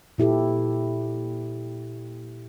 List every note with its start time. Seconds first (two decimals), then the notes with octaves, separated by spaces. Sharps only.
0.18 A#2 E4 G4 A4